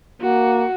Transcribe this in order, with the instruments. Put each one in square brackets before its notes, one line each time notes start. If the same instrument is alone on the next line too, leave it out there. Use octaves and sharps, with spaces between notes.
[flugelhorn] A#3 [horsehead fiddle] F#4